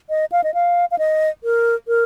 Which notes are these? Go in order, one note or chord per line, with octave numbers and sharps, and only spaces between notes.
D#5
F5
D#5
F5
F5
D#5
A#4
A#4